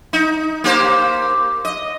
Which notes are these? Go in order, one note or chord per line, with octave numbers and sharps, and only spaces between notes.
D#4
A#3 G4 C5
D#5